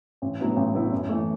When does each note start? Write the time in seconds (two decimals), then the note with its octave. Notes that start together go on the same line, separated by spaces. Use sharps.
0.22 A1
0.39 A2 F#3 B3 E4
0.57 A1
0.74 A2 F#3 B3 E4
0.92 F#2
1.09 E3 A3